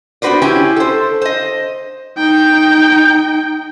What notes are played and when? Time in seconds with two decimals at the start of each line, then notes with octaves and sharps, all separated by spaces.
0.22 B3 D4 F#4 B4 C5 D5
0.42 C#4 E4 G4 G5 G#5
0.76 A4 C5
1.22 C5 D#5
2.18 D#4 G5